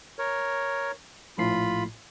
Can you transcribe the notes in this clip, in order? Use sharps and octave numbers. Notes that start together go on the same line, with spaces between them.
A#4 C#5
A#1 A2 F4 B5 C7